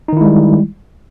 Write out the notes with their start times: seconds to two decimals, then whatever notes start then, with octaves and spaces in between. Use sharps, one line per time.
0.08 D#4
0.13 D#3
0.17 E4
0.21 G#3
0.25 G3